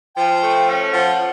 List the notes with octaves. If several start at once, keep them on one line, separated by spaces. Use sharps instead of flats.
F3 G5
A3
C#4
F3 F#5